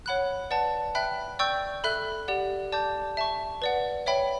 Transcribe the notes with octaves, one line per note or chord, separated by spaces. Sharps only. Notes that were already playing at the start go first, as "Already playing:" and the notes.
C#5 F#5 B5 F#6
B4 D5 F#5 A5
E5 G5 B5 F#6
D5 G5 C#6 E6 G6
A4 E5 B5 F#6
G4 D5 F#5
D5 A5 D6 G6
E5 A5 C#6
B4 D5 F#5
C#5 E5 G5 B5